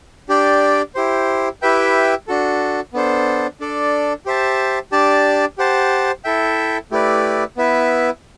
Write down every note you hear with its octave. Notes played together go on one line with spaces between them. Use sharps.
D4 G4 D5 G5
E4 G4 C5
E4 G4 B4 E5 G5
D4 F#4 A4
B3 D4 A4 C5
D4 A4 D5
G4 C5 E5 A5
D4 G4 D5 A5
G4 C5 F#5 A5
E4 A4 E5 G5
A3 E4 G4 B4 D5
B3 E4 B4 E5